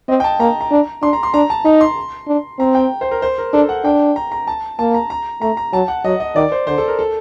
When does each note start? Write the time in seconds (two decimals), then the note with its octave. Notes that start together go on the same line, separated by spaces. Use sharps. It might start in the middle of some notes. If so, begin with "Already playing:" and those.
0.08 C4 D#5
0.20 G5
0.24 A5
0.40 A#3 A#5
0.61 A#5
0.71 D4
1.02 D4 C6
1.13 A#5
1.23 C6
1.34 D4 A#5
1.50 A5
1.65 D#4 A#5
1.81 C6
2.28 D4
2.59 C4 A#5
2.75 G5
3.01 C5
3.11 A#4
3.22 C5
3.38 A#4
3.53 D4 A4
3.69 F#5
3.85 D4 G5
4.16 A#5
4.32 A#5
4.47 A5
4.79 A#3 A5
4.94 A#5
5.10 A#5
5.42 A3 A#5
5.57 A#5
5.73 F#3 A5
5.88 F#5
6.04 F#3 D#5
6.20 D#5
6.36 D#3 D5
6.52 C5
6.67 D3 C5
6.78 A4
6.88 A#4
6.99 A4